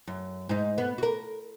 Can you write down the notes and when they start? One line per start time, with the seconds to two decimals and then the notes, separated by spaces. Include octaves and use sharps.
0.07 F#2
0.49 G#2 D#4
0.78 B3
0.98 F#4 A#4